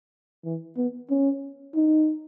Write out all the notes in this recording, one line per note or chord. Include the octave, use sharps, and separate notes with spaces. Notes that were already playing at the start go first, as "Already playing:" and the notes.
E3
B3
C#4
D#4